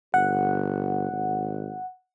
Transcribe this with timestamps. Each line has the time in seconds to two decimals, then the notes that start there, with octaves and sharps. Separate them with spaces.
0.14 G1 F#5
1.12 G#1